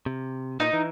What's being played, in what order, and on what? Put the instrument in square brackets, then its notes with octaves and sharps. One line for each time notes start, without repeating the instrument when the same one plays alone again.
[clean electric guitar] C3
[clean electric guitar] A#2 [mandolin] D#4
[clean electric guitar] E3